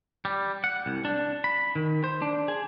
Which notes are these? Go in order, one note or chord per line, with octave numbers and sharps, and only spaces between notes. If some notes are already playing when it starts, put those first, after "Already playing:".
G3
F#5
C2
D4
B5
D#3
C5
D4
G#4